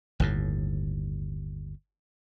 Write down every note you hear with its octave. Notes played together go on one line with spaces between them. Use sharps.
G1 D#2 A2